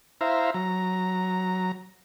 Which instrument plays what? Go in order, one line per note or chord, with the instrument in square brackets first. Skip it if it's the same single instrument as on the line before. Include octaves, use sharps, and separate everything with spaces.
[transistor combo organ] E4 C5 E5 F5 A#5
F#3 A#5